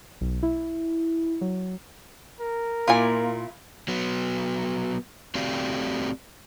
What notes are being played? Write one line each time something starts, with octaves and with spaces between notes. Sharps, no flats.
B1
E4
F#3
A#4
A#2 A#3 E4 F4 G#5
F#3 B3
A3 C4 F#4 G4 D5 F5